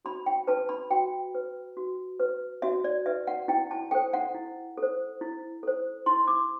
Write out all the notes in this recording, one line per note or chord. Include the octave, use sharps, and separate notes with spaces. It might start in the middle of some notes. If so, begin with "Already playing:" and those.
F#4 B5
G5
B4 A5
B5
F#4 G5
B4
F#4
B4
F#4 E5
D5
B4 E5
F#5
E4 G5
A5
A4 C5 G5
F#5
E4
A4
C5
E4
A4 C5
E4 C6
D6